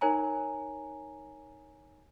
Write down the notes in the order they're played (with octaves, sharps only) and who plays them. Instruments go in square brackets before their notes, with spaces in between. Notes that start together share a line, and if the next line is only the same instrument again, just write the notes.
[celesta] D#4 A#4 C#5 G#5 A#5